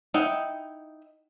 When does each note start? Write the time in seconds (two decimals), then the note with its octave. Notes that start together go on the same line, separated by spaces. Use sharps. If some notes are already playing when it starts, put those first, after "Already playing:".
0.14 D#4 E4 F#5 G5